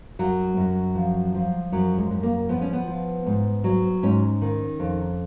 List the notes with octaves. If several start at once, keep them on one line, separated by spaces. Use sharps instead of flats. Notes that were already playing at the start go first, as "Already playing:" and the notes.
F#2 F#3
F#2
F3
F3
F#2 F#3
G#3
F#2
A#3
F3 B3
C#4
B3
F3
G#2
F#3
G#2 C#4
D#3
F2